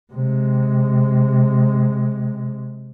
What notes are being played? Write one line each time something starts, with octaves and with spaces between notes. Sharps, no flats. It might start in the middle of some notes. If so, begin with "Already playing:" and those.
C3 G#3